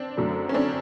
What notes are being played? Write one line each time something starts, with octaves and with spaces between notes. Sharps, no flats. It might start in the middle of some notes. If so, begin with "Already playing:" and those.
Already playing: C4 D4
F#2 D3 F#3 A3
C#4
C4 D4